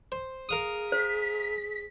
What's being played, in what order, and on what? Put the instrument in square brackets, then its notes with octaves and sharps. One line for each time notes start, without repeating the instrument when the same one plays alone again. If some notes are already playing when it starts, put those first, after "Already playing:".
[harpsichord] C5
[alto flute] G#4 [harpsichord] A#4 F5 D#6
[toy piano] C5 [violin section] B6